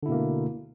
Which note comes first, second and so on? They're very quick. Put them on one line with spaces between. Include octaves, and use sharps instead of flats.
D3 E4 B2 A#3 A3